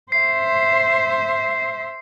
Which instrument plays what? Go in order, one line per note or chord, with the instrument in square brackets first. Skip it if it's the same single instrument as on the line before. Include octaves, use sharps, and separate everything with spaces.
[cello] C5 E5 [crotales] C7